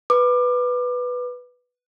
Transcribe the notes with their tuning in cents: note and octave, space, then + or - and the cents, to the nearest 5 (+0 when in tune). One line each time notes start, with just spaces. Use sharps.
B4 +0 D6 +25